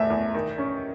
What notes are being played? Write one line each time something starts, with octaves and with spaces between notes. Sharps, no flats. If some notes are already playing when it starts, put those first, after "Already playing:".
Already playing: E2 A3 E5
E2
D#3
C#4